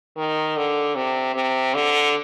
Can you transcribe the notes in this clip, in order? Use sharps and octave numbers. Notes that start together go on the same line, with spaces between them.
D#3
D3
C3
C3
D3